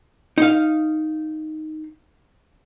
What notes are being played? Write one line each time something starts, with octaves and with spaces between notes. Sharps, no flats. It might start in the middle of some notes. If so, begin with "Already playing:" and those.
D#4 F5